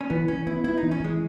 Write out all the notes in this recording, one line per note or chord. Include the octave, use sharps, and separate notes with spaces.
C#4
E3 B3
E3 C#4
B3 E4
B3 E4
D#4
E3
C#4
E3 G#3